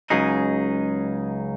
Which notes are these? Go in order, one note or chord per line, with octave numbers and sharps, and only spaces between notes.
C#2 C#3 F#3 D#4 G#4